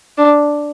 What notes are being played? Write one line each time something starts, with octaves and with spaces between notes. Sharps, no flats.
D4